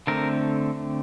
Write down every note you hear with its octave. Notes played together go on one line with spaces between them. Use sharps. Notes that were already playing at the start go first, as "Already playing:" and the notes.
D3 A3 C4 A#4